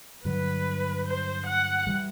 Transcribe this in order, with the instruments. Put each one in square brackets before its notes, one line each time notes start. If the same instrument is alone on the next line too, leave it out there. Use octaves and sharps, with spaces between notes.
[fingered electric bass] G2 D3 F#3 [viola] B4
[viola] C5
F#5
[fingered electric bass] E3 G3